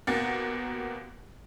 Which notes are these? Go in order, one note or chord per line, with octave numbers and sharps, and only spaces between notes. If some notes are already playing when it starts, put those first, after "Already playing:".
D#2 B2 A#3 F#5 A6